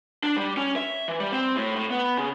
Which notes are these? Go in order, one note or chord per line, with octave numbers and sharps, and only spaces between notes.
D4
G3
C#4
E5
E3
G3
C4
A2
A2
B3
C#3